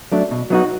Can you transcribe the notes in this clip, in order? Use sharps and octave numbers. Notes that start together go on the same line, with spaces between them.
F#3 A3 D4
B2
F#3 B3 D#4 F#4